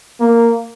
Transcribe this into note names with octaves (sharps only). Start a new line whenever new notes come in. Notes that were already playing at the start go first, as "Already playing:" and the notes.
A#3